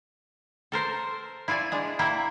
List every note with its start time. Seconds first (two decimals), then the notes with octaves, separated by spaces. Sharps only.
0.72 A4 A#4 C5
1.48 E4 F4 D5 G#5
1.72 G#3 D4
1.99 A#3 E4 G5